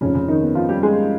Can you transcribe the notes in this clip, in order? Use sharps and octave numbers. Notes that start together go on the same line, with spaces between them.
F1 F2 C#3 F3 C#4
C#3 C#4
D#3 D#4
B3
F3 F4
G3 G4
G#3 G#4